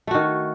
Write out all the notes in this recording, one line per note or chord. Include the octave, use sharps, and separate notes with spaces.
D#3 A3 F#4